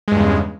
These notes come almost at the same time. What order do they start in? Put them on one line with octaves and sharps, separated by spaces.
G#3 G2 E2 C#3